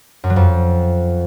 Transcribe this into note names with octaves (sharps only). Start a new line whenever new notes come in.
F#2
F#3
F2